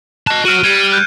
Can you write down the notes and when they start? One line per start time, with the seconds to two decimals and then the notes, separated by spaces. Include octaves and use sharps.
0.27 D#5 A5 F#6
0.45 F#4 C#5 F6 D7 D#7
0.64 G3 G#6 D#7
0.92 F#6 G6